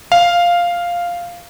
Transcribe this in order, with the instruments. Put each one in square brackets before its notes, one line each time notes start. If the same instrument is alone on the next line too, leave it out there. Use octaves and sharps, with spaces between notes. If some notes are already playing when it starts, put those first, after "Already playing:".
[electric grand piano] F5